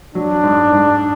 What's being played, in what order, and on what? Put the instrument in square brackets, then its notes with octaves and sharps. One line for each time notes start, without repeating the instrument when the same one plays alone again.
[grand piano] F#3 [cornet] D4
[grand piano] G#2
G#2